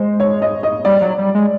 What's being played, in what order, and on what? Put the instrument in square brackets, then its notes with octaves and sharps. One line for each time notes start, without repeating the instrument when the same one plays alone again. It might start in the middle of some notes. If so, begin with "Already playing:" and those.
Already playing: [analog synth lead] G#3 [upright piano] C5
[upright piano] C#5
D#5
D#5
[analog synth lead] G3 [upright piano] D5
[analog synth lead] F#3
G3
G#3